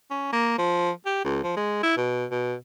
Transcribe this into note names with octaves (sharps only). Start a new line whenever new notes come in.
C#4
A#3
F3
G4
C#2
F3
G#3
E4
B2
B2